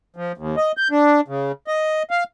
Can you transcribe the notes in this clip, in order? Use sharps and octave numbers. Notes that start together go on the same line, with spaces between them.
F3
D#2
D#5
G6
D4
C#3
D#5
F5